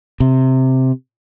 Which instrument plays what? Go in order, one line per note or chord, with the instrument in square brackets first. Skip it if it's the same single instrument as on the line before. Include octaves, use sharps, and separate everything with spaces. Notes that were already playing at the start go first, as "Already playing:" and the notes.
[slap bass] C3